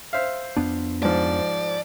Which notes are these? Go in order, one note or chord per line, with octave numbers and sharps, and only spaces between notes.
C5 E5 F5
F2 B3 D4
G#2 F3 D5